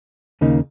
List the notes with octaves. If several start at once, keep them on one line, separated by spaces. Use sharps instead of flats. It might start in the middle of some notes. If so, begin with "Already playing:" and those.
D#2 C#3 A#3 D#4